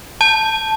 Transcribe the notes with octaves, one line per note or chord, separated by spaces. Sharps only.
A5